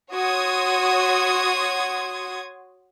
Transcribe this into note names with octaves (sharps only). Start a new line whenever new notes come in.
F#4 C#5 C6 D#6 G#6